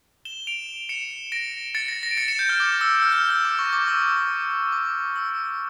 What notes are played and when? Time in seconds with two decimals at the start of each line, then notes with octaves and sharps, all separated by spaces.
0.25 E7 G7
0.47 D7 F7
0.89 C#7 E7
1.32 A#6 D7
1.75 A6 C#7
1.88 A#6
2.03 A#6
2.11 D7
2.17 A6 C#7
2.28 C#7 E7
2.39 G6
2.49 F6
2.60 D6
2.81 E6
3.03 F6
3.12 G6
3.17 F6
3.30 E6
3.45 D6
3.59 C#6
3.73 D6
3.88 E6
4.72 D6
5.16 E6